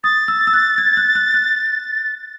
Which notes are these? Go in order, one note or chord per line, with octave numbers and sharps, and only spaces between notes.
D#6 A6
E6
E6
F#6
G#6
F#6
F#6
F#6